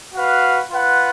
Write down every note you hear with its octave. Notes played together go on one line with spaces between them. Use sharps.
F#4 B4 F5
F4 B4 F#5